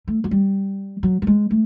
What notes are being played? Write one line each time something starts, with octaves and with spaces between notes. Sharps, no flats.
A3
F#3
G3
F#3
G3
G#3
A3